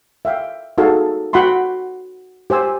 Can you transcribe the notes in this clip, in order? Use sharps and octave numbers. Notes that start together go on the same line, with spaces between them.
E5 F5 G5
D#4 F#4 G#4 A4 F5
F#4 F#5 G5 B5 C6
G4 C5 G#5 E6